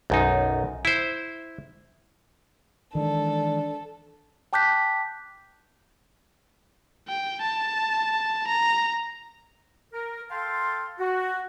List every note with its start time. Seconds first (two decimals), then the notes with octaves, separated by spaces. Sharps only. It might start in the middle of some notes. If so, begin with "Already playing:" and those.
0.10 B1 F#2 D#4
0.85 E4 C5
2.95 D#3 E3 G#3 D4 A4
4.53 G5 A5 D6 F#6 G6 B6
7.08 G5
7.41 A5
8.47 A#5
9.93 A#4
10.30 A4 F5 G5 A5 C6
10.99 F#4